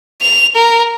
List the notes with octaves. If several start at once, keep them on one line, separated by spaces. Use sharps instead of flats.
F7
A#4